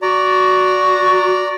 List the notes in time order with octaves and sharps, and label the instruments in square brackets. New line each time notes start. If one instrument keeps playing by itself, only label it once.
[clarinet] F#4 [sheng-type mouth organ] D5 A#5